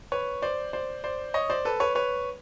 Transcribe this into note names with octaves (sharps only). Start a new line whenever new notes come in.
B4 C#5
C5 D5
C5 D5
C5 D5
C#5 D#5
C5 D5
A4 B4
B4 C#5
B4 C#5